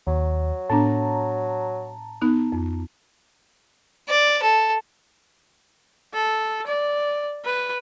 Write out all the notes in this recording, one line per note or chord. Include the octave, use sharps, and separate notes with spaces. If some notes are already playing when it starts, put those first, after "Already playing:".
D#2 F#3
A2 B3 D4 A5 A#5
B3 D#4 F#6
F2
D5
A4
A4
D5
B4